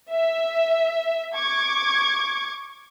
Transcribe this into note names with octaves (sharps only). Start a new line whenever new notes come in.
E5
C#6 D6 G#6